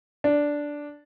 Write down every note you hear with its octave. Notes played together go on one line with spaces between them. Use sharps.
D4